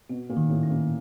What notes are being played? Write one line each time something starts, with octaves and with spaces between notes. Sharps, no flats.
B2 F#4
A#2
D#3
A2
C#4
A#2